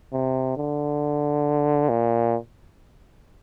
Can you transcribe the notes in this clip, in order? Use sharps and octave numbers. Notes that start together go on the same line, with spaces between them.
C3
D3
A#2